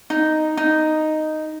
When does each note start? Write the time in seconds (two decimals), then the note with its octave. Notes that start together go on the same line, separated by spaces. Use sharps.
0.10 D#4
0.57 D#4